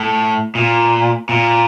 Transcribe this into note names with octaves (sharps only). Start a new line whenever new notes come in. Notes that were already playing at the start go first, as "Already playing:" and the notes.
Already playing: A2
A#2
A#2